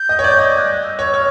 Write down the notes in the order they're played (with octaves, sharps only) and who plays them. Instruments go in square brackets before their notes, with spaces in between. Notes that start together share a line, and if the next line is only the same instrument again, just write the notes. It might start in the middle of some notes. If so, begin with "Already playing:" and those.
Already playing: [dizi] G6
[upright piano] D#5
C#5
D5
[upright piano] D#5 [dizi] G#6
[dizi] G6
F#6
E6
[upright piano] C#5 [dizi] E6
[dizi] F#6
[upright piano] C#5 [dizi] F6